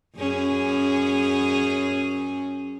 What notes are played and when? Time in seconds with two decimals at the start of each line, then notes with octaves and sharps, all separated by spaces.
0.18 F#2 C#4 G#4